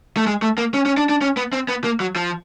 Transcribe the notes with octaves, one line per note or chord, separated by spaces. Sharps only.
A3
G#3
A3
A#3
C#4
C#4
D4
D4
C#4
B3
C4
B3
A#3
F#3
F3